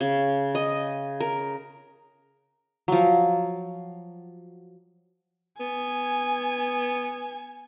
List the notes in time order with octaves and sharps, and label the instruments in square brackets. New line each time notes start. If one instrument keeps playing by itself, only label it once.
[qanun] C#3
D#5
A#4
F3 F#3
[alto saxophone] B3 [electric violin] G#5